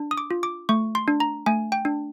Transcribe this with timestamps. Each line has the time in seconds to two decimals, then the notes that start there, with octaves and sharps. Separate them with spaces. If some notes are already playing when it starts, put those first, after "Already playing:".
Already playing: D4
0.11 D#6
0.17 D6
0.31 F4
0.43 D6
0.69 A3 C#6
0.95 C6
1.08 D4
1.20 A#5
1.46 A3 G#5
1.72 G5
1.85 D4